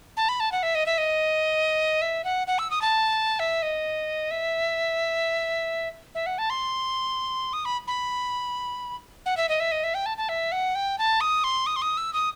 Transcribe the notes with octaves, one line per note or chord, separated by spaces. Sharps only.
A5
B5
A5
F#5
E5
D#5
E5
D#5
E5
F#5
F#5
E6
D#6
A5
E5
D#5
E5
E5
F#5
A5
C6
D#6
B5
B5
F#5
E5
D#5
E5
D#5
E5
G5
A5
A5
E5
F#5
G5
A5
D#6
C6
D#6
C6
D#6
E6
D#6